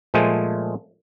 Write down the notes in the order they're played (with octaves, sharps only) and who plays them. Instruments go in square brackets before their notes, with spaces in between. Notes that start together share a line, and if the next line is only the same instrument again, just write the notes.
[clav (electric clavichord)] A#2 F3 G#3 A3 G#4 C5